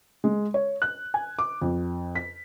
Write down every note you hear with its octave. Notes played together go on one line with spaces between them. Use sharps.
G#3
C#5
F#6
G#5
D6
F2
B6